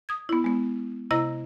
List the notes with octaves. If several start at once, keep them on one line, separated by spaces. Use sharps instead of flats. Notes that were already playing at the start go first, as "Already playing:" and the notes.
D#6 G#6
B3 E4
G#3 B3
C3 E4 D#5 A#5 E6 A#6